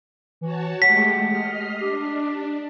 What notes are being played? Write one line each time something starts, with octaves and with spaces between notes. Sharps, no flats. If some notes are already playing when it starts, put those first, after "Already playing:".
E3 F#4 C#5 A5
G#3 A3 G4 F#5 B6
D#5 F6 C7
D4 G4